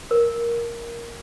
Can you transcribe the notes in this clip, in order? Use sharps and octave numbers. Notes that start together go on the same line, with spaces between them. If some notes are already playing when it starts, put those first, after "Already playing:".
A#4